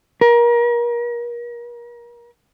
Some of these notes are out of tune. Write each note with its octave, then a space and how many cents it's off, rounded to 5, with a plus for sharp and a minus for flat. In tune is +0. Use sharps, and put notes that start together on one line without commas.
A#4 +35